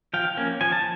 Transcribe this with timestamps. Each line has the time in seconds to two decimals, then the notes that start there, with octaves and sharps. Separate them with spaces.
0.14 F3 F5 G5
0.37 A#3 C#4
0.61 F3 G#5
0.72 A5